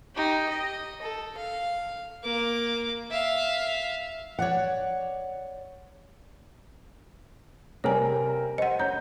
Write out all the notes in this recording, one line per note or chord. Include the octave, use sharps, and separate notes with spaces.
D#4 G4
D#5
A4
F5
A#3 D6
E5 F5
C#5 D5 F#5
C3 G3 A#4 C#5 G#5
C5 D#5 F#5
C#5 A#5 G6